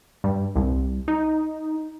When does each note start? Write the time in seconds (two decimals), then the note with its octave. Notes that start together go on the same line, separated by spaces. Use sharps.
0.24 G2
0.56 C2
1.08 D#4